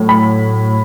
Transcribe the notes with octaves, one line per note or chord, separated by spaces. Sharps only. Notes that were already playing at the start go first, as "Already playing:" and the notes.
Already playing: A2 F#3
B5